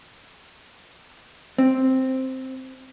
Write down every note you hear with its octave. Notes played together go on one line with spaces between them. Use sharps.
C4